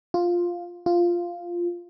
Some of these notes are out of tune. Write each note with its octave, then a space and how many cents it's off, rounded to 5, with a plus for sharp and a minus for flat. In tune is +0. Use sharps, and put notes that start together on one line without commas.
F4 +5
F4 -5